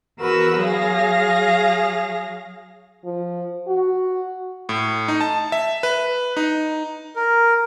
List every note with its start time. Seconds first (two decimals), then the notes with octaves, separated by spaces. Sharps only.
0.19 E2 F#4 A#4 B4 E6
0.61 F#3 G#4 F5 A#6
3.05 F3
3.67 F#4
4.69 A2
5.08 D#4
5.21 A5
5.52 E5
5.83 B4
6.37 D#4
7.16 A#4